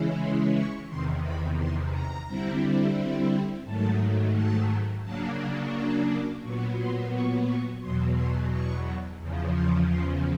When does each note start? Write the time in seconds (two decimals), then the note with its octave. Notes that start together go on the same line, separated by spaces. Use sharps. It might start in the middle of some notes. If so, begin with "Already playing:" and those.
Already playing: C#3 E3 G#3 C#4 E4
0.18 C6
0.54 C#6
0.87 E2 C3 D#3 C6
1.23 B5
1.57 C6
1.92 A#5
2.27 D3 G3 C4 E4
3.65 G#2 D#3 F#3 A3 A5
4.34 A5
5.04 C#3 F#3 A#3 D4 A5
5.73 C#6
6.08 D6
6.42 A#2 F#3 B3 C#6
6.77 C6
7.12 C#6
7.46 C#6
7.80 E2 B2 F#3 C6
8.15 C6
8.50 C#6
9.19 E2 C#3 F3
9.53 C6
9.89 C6